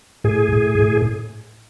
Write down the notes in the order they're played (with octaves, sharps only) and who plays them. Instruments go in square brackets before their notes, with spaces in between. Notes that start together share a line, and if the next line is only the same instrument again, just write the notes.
[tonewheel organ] A2 G#4
A2
A2